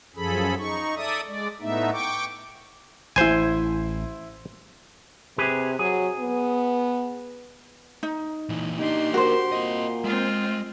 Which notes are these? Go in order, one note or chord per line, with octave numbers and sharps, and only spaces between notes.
F#2 F3 G#4 A4 B5
D#4 C#6
A4 D5 E5 D#6
G#3 D5
A2 A3 B3 D#4 E5
G5 C#6 D6
A1 E4 C5 G#5 C6
C3 G4 G#4 B4
F#3 G#4
B3
D#4
A#2 E3
A#3 D4 D#4 G4 C6
F#4 A#4 C5
A#2 C4 D#5
G#3 C4 F4